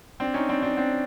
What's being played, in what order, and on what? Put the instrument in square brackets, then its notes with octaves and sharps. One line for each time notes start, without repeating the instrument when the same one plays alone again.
[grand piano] C4 D4
C#4 D#4
C4 D4
C4 D4
C4 D4